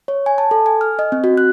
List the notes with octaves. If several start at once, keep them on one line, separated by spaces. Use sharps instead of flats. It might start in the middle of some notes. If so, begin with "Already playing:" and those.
C#5
G#5
A5
A4
G#5
F6
D#5
C4
F#4
F#6